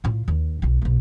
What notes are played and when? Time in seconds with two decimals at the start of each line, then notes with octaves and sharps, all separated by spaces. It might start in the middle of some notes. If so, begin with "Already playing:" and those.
0.04 A2 F4
0.28 D#2
0.62 B1 F4
0.82 B1 A#3